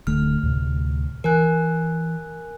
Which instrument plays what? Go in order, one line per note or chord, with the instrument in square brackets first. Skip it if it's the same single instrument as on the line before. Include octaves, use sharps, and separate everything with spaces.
[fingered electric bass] D1 D3 A3 [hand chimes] F6
[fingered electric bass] D2 A2 C3
[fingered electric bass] E3 [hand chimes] A#4 G#5 F#6